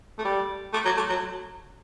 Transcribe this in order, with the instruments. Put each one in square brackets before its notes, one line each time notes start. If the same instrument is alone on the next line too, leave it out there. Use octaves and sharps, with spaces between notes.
[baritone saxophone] A3
G3
A3
F#3
A3
F#3